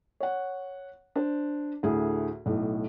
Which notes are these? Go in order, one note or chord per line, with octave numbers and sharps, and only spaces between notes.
C#5 F#5
D4 C5
D2 A2 G#4
B1 A2